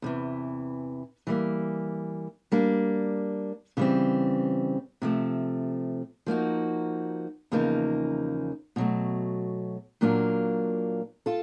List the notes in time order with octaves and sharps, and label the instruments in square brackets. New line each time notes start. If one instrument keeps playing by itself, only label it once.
[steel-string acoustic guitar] E2 C3 E3
E3 G3 A#3
G3 A#3 D4
C#3 E3 G3 C4
C3 F3 A3
F3 A#3 D#4 F#4
E2 C#3 F3 A#3 D#4
B2 F#3 A3
A#2 F#3 A#3 D4 F4
F4 A4